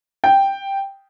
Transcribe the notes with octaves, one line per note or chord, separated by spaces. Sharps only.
G5